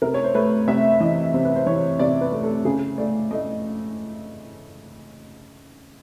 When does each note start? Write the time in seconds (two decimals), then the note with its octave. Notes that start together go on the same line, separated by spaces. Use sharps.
0.02 C3 A#4
0.14 C#5
0.24 C5
0.35 A3 B4
0.67 C3 E5
1.00 E3 D#5
1.34 C3 C5
1.45 B4
1.55 C5
1.66 E3 C#5
1.99 C3 D5
2.21 B4
2.32 A3
2.43 A4
2.65 C#3 G#4
2.98 A3 D5
3.31 A3 D#5